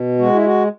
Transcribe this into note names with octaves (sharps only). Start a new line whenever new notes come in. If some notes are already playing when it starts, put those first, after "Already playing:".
Already playing: B2
G#3 F#4
E4
F#4